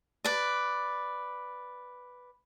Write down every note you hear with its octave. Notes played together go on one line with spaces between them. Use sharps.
B4 D5